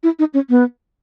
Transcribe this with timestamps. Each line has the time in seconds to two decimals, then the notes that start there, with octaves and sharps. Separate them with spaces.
0.03 E4
0.19 D#4
0.34 C#4
0.50 B3